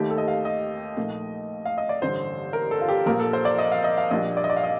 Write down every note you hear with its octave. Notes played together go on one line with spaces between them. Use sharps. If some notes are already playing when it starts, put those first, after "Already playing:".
Already playing: D#2 D#3 A3 D#4 G4
A4
D#5
F5
D#5
A#1 A#2 A3 D#4
F5
D#5
D5
A1 G2 D3 G3 D4 C5
A#4
A4
F4
G4
A#1 A#2 F3 A#4
A4
C5
D5
D#5
F5
D#5
F5
A#1 A#2 G3 D4 D#5
D5
D#5
D5
F5
D#5